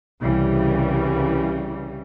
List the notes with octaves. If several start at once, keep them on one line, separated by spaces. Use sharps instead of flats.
C2 C#3 E3 G3